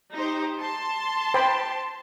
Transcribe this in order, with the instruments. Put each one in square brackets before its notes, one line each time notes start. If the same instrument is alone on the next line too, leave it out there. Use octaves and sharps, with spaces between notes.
[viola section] D#4 G4 C5
A5 C6
[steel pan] C5 G5 B5